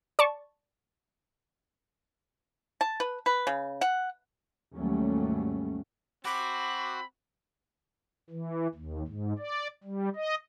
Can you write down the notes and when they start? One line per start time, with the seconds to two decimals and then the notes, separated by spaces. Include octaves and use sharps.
0.19 D5 A5 C#6
2.81 A5
3.00 B4
3.26 B4
3.47 C#3
3.81 F#5
4.74 D#2 G#2 F#3 G3 A3 C#4
6.25 C4 F#4 B5 D6
8.30 E3
8.74 D#2
9.07 G#2
9.39 D5
9.83 G3
10.16 D#5